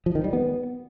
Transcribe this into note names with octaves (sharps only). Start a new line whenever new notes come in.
F3
D#3
G3
B3